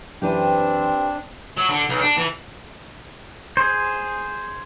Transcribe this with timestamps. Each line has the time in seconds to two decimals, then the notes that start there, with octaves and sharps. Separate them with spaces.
0.22 F#2 E3 C4 D4 G4 B4 C5
1.57 F#3
1.70 D3
1.89 B1
2.01 D4
2.17 E3
3.57 G#4 C5